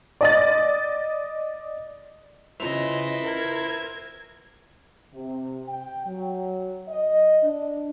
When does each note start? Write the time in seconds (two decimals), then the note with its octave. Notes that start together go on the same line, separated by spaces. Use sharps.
0.21 D5 D#5 A6
2.60 C#3 E4 F4 B4 C5 D#5 C6 F7
3.23 A#4 G#6
5.13 C3
5.68 G5
6.06 F#3
6.88 D#5
7.43 D4